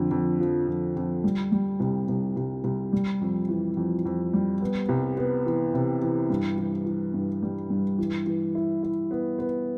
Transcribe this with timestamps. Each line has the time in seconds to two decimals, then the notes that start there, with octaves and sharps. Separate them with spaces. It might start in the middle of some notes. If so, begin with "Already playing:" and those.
Already playing: F2 D3
0.11 F2
0.40 F3
0.67 F2
0.96 F2
1.24 G3
1.52 G3
1.80 C2
2.09 C2
2.36 C2
2.64 C2
2.93 G3
3.21 F2
3.49 E3
3.77 F2
4.05 F2
4.33 G3
4.61 B3
4.89 C2
5.17 B3
5.46 E3
5.74 C3
6.02 E3
6.30 G2
6.58 E3
6.86 E3
7.14 G2
7.42 G3
7.70 G2
7.98 E3
8.26 E3
8.55 E4
8.83 E4
9.11 B3
9.39 B3